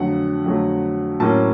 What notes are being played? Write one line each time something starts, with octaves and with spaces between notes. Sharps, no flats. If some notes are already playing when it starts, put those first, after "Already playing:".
Already playing: F2 D3 F#3 A3 F#5
F2 D3 F#3 A3
A2 F#3 A#3 C#4 A5